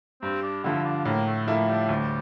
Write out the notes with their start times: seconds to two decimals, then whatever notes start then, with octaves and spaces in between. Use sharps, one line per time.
0.22 G2 C4
0.43 D4
0.64 D3 F3 E4
0.85 D4
1.05 A2 A#3
1.26 A3
1.47 F3 A3 A#3 E4
1.68 G3
1.89 D2 G3